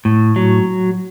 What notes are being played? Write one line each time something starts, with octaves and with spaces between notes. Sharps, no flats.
A2
F#3